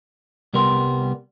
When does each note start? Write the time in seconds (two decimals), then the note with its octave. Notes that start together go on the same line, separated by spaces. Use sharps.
0.53 C2 G3 B3 A#4 C6